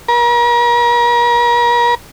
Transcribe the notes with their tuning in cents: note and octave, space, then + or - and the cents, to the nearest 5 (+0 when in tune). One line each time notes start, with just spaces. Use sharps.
A#4 +40